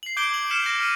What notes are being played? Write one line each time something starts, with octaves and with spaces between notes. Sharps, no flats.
C7 F#7
D6 G6 G#6 C7 D7 G7
F#7
F6 G6 B6 C#7 E7 F#7
G6 A#6
F6 D#7